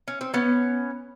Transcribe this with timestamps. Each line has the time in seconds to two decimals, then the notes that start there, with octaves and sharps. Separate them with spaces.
0.08 C#4
0.21 C4
0.34 B3 C#4